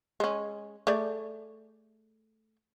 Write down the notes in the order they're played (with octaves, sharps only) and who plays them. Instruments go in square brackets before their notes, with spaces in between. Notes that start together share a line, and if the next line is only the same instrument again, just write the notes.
[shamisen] G#3 C#4
A3 G#4 D5